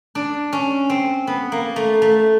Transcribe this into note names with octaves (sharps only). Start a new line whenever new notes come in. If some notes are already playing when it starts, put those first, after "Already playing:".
D4
C#4
C4
B3
A#3
A3
A3